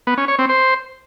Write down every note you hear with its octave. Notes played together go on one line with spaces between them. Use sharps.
B3
C#4
C#5
C4
C5